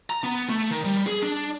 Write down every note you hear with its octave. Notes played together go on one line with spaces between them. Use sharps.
A#5
B3
A3
D#3
G3
G#4
D4